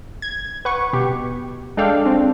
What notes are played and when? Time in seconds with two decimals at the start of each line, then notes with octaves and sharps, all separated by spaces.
0.22 G#6
0.65 B4 F#5 C#6
0.93 B2 G4
1.77 G#3 D4 A4 F5 G5
2.05 C4 D4